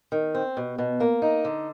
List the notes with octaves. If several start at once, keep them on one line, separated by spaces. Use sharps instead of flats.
D#3
C4
B2
B2
A#3
D#4
D3